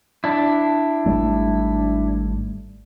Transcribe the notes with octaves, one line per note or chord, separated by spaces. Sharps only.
D4 E4
G#1 G3 A3